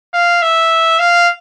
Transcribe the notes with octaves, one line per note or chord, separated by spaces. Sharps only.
F5
E5
F5